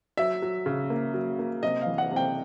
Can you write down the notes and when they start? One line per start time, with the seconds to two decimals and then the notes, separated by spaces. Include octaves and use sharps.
0.17 F#3 E5
0.42 F#3
0.66 C#3
0.90 A#3
1.14 F#3
1.39 A#3
1.63 C3 D#5
1.81 E3 F5
1.98 F#5
2.11 C3
2.16 G5